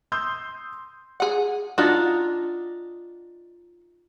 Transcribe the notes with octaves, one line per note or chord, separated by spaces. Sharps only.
C6 D#6 E6 G6
G#4 F#5
D4 D#4 F4 F#4